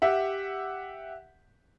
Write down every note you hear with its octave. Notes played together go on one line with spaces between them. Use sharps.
G4 E5 F#5